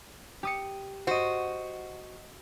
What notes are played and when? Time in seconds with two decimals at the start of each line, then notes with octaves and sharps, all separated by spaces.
0.43 G4 D#6 C#7
1.07 F#4 C5 D#5